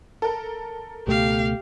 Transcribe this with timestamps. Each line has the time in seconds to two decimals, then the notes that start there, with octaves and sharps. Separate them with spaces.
0.22 A4 A#4
1.07 C#2 B2 A3 G4 F5